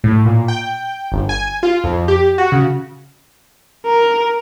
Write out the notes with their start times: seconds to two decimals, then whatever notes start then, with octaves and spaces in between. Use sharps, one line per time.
0.04 A2
0.26 A#2
0.48 G5
1.12 G1
1.29 G#5
1.63 F4
1.84 F2
2.08 G4
2.38 F#4
2.52 C#3
3.86 A#4